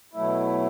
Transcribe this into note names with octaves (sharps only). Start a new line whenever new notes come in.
B2 F#3 A3 E4